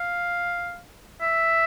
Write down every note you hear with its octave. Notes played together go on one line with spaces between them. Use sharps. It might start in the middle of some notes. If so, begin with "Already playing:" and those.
Already playing: F5
E5